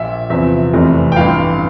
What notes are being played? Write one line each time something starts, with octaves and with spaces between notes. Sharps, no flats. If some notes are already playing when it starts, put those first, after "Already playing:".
Already playing: A#1 A#2 F3 E5
E2 C3 F3 E5
F1 E2 C3 E3
G5
A1 G2 E3 F5